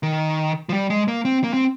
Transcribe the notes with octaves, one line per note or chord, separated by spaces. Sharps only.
D#3
F3
G3
G#3
A#3
C4
A#3
C4